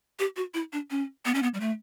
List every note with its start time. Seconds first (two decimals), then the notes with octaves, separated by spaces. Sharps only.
0.19 G4
0.36 F#4
0.54 E4
0.73 D4
0.90 C#4
1.25 B3
1.34 C#4
1.43 B3
1.54 G3
1.60 A3